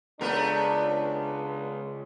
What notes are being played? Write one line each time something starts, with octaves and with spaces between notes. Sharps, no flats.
C#2 A3 B3 D4 A#4